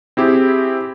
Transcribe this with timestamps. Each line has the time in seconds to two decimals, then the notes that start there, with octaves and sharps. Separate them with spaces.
0.17 C4 E4 G4 G#4